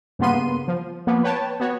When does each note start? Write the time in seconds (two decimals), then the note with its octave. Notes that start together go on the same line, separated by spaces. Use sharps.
0.19 G2 C#3 A#3 B3 C6 D#7
0.68 F3
1.07 F3 A#3 B3
1.23 B4 C#5 G5 A5
1.60 B3 F#4 C#5